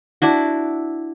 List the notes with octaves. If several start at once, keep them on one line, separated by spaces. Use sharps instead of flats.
D4 E4 F#4